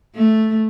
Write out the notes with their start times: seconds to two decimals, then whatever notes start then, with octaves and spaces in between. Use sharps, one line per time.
0.15 A3